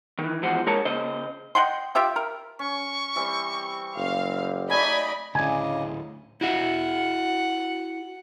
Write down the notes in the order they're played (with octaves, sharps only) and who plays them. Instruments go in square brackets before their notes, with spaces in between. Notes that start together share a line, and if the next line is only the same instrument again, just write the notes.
[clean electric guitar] D#3 E3
E2 G#2 F3 F#4 C5
G#3 A#4 C#5 A5
C#3 C5 D#5
[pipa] D#5 F#5 G5 C6
F4 G4 E5 G5
A#4
[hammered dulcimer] C#4 [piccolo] C#6
[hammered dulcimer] E3 G3 C4
[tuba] F#1 [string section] F5
[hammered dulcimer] F#3 A3 D#4 [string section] D5 D#5 B5 [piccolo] G#5
[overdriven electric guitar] D2 A2 [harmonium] C#3 D4 D#5 [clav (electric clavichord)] G#5
[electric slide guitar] E4 F#4 E5 [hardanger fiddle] F#5